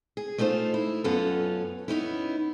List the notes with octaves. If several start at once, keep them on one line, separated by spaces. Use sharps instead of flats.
G#4
A3 D#4 F4 B4 C5
E4
F#2 B3 C#4 F4 A4
B3 C#4 D#4 E4